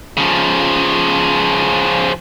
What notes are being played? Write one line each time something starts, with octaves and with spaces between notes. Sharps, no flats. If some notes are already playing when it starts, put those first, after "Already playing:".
C#3 F3